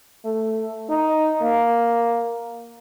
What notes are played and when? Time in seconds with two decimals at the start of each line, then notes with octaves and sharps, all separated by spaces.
0.25 A3
0.90 D#4
1.42 A#3